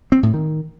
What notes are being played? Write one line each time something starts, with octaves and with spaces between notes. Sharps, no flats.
C4
A2
D#3